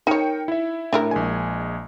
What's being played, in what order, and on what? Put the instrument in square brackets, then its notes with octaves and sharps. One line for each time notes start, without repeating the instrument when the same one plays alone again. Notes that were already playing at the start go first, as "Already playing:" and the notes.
[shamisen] D#4 C#5 [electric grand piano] A#4 G5 C#7
[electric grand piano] E4 E5
[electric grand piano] A2 [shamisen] D4 E4 A#4
[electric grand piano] A#1 G#3 G#5